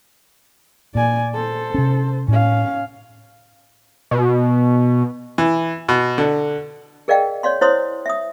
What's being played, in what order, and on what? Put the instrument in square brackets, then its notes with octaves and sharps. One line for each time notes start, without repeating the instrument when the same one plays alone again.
[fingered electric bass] A#2 [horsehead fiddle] D5 G#5
[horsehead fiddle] A4 C5
[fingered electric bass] C3 C#4
[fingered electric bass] A2 [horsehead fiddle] C#4 F5
[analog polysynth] B2
[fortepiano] E3
B2
D3
[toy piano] G#4 A#4 D5 D#5 F5 G5
C#5 D5 F5 C6
E4 C5 C#5 F5 C6 D#6
E5 D#6